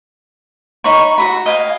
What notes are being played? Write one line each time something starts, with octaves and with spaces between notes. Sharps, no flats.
D#4 C#5 B5 C#6
F#4 G#4 B5
D#5 F5 G5 G#5